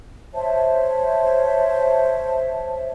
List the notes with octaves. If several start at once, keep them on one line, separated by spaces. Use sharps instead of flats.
C5 C#5 E5 A5